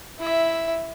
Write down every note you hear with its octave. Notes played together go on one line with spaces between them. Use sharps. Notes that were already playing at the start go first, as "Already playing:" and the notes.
E4 E5